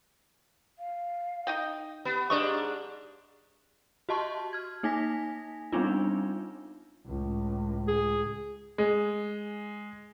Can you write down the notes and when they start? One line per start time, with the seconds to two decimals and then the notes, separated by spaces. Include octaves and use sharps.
0.79 F5
1.47 D#4 D#5 G5
2.05 B3 G4
2.30 G#2 C#3 D4 D#5 C#6
4.09 F#4 G4 D#5 A5 C6 C#6
4.53 F6 G#6
4.83 A#3 D#4 G#5 A#6 B6
5.72 G3 B3 C4 D4 D#4 F4
7.07 C#2 A2
7.88 G#4
8.78 G#3